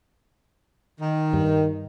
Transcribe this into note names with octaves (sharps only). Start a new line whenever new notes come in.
D#3
G2